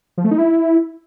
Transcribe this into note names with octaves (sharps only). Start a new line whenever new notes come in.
F3
A3
D#4
E4